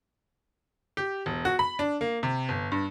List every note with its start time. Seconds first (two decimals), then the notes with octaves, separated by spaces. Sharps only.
0.97 G4
1.26 E1
1.45 F#4
1.59 B5
1.79 D4
2.01 A#3
2.23 C3
2.49 G1
2.72 G2